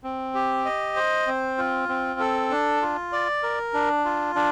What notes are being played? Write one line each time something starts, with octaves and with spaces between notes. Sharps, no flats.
C4
G4
D#5
C5
C4
F4
C4
A4
D4
F4
D5
A#4
D4
F4
D4